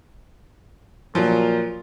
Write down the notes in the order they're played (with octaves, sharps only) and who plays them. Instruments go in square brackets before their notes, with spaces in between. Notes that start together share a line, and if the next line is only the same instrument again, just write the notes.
[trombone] A#2 [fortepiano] F3 F#3 F4